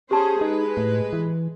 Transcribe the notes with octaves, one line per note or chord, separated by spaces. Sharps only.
C#4 G4 G#4 C5 A5
G#3 D#4 B4
A2
E3